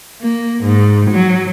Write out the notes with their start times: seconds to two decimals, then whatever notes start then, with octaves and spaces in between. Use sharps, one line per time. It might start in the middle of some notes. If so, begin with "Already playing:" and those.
0.22 A#3
0.64 G#2
1.10 F#3